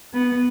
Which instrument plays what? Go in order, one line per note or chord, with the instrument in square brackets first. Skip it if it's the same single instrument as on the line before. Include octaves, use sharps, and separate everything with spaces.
[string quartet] B3